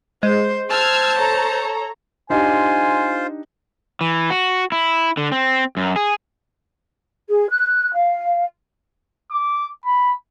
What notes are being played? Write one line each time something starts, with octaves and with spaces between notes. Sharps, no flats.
G#3 C5
C5 A5 E6 F6 G#6
A4 C#5 A#5
D4 D#4 F4 G4 C5 G#5
E3
F#4
E4
D3
C4
F#2
G#4
G#4
F#6
F5
D6
B5